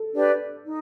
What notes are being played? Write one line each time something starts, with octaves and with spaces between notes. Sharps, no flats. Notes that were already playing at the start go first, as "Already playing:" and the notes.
Already playing: A4
D4 G4 B4 D5
D#4